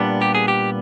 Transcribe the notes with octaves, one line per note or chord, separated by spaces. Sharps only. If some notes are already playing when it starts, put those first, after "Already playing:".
Already playing: A#2 G3 B3 D4
G4
G#4
G4